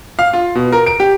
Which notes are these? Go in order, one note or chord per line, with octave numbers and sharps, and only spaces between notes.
F5
F4
B2
A#4
D7
G4